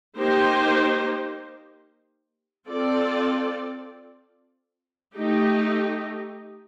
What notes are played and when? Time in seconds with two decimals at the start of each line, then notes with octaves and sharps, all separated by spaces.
0.18 A#3 D#4 G4 C5
2.67 C4 F4 A4 D5
5.15 A3 D#4 G4